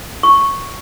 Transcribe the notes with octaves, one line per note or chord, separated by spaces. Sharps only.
C#6